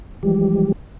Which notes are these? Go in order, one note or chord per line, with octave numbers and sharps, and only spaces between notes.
E3 F3 G3 G#3 G4